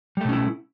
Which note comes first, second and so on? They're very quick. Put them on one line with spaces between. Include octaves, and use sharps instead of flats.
G3 A3 B2 C#4 E4